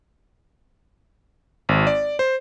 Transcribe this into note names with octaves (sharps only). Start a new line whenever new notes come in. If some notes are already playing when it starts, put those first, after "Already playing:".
G#1
D5
C5